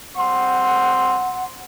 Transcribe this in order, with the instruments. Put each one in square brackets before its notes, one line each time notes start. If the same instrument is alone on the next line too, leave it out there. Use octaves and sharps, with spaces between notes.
[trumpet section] G3 C4 C6 [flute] F#5